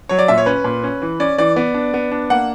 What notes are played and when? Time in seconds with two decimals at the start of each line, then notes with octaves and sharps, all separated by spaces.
0.09 F#3 C#5
0.19 D5
0.28 A#2 E5
0.38 C#5
0.46 C#4 B4
0.64 A#2
0.84 C#4
1.02 E3
1.20 C#4 D5
1.38 E3 D5
1.56 B3 D5
1.74 D4
1.94 B3
2.12 D4
2.30 A#3 F#5